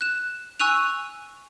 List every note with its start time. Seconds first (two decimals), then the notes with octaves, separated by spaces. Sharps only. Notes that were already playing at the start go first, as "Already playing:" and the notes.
0.01 F#6 E7
0.60 G#5 C#6 E6 F#6 D#7 F7